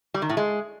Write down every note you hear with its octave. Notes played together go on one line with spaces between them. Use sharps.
G3
D#3
A2
G#3